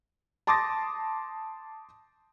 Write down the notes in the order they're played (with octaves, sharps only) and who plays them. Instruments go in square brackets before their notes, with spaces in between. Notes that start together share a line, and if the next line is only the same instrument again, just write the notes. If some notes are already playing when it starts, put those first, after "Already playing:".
[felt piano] A5 C6 D6 D#6 A6 A#6